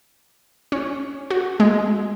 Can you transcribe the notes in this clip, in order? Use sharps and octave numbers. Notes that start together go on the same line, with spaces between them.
C#4
F#4
G#3